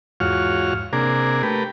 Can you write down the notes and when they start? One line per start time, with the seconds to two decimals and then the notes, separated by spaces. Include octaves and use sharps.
0.20 E2 G#2 F4 F#4 C#5 F6
0.93 C3 A#3 D4 G#4 A#4
1.43 A3 G4 A#4 B4